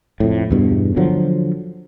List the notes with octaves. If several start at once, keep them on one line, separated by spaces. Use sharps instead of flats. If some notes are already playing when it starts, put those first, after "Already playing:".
F2 A2
E2 G2 B2
D3 F3 F#3